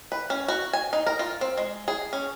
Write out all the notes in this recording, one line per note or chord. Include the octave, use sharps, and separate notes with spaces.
B4
C#4
F#4
G#5
D#4
A#4
F4
C4
G#3
G#4
C#4